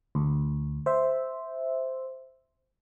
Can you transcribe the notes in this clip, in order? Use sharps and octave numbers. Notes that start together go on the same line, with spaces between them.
D2
C5 E5